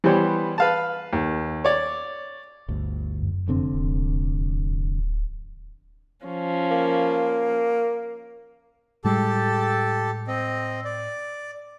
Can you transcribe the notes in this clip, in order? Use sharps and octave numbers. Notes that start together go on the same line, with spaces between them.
E3 G3 B3 G4 C5 C#5
B4 F5 A5
D#2
C#5 D5
G1 D2
F#2
F1 D3 C4
D1
F3 C#4
A#3
A2 G3 G#3 G4 A4 A5
C4 D#5
D5